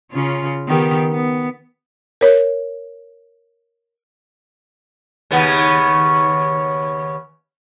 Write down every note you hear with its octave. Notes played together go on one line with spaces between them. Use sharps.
C#3 C#4 F4
D#3 B3 G4
B3
A#4 C#5
D#2 C#3 B3